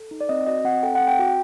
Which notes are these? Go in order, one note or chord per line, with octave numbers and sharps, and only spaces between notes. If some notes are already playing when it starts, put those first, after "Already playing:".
Already playing: A4
D#4
D5
C4 D#5
F#4 D#5
C4 F#5
A4 G5
F#5
C4
G5
F#4